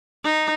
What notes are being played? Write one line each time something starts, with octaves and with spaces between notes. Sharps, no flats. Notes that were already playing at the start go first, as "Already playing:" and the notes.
D#4